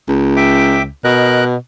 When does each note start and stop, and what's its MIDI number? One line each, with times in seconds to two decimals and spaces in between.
0.09 0.88 37
0.36 0.82 76
0.36 0.82 79
0.36 0.82 86
1.04 1.56 47
1.04 1.44 70
1.04 1.44 75
1.04 1.44 90